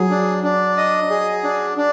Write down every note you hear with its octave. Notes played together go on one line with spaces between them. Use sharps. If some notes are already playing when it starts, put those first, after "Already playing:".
Already playing: F#3 G#4
D4
D4
D#5
G#4
D4
D4